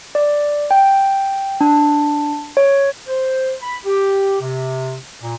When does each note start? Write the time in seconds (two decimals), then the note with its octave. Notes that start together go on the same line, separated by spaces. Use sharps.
0.15 D5
0.71 G5
1.61 D4
2.57 C#5
3.07 C5
3.62 B5
3.86 G4
4.41 C3
5.22 A#2